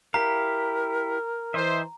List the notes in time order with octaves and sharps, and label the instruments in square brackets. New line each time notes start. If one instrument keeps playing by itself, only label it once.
[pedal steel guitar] E4 G4 F5 [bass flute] A#4 [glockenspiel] A#5
[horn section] E3 C5 [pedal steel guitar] D#5 E5